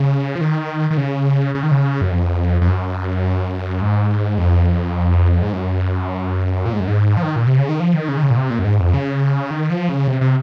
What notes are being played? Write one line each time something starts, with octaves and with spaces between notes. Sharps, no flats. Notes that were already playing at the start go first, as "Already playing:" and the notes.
Already playing: C#3
F3
D#3
D#3
C#3
C#3
D#3
C#3
F#2
F2
F2
F#2
G#2
F2
G#2
F#2
A#2
G#2
F#2
G#2
F3
D#3
A#2
C3
C#3
D#3
F3
D#3
C#3
D#3
C#3
A#2
C3
A#2
F#2
G#2
F2
C#3
D#3
F3
C#3
C3
C3